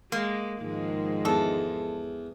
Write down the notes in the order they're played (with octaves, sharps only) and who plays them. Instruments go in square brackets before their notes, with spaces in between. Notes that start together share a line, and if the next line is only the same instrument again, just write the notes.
[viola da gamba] G#3 [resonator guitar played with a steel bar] A#3
[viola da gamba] G#2 F3 G#3 [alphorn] D#3
[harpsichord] E2 [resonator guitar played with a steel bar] A4